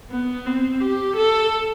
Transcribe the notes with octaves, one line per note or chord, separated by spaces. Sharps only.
B3
C4
G4
A4